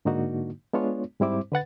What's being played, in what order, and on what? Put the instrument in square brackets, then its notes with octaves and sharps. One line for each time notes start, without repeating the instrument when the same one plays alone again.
[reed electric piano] G#2 D3 A#3 D4 D#4 F#4
G#3 B3 D4 F4 C#5
G#2 G3 C4 E4 C5 D6
D3 B4 F#5 A6